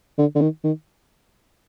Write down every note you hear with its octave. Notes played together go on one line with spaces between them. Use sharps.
D3
D3
D#3
D#3